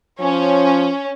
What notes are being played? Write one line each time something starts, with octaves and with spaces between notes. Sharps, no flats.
F3 C#4